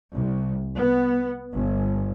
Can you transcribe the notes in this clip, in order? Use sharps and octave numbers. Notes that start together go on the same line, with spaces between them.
C2
B3
G1